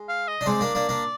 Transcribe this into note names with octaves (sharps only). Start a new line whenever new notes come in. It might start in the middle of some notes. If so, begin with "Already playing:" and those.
Already playing: G#3
F5
D#5
D4
G#3 C4 D5
A#3 D4
A#3 D4
A#3 D4